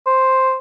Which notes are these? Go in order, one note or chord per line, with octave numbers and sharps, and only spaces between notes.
C5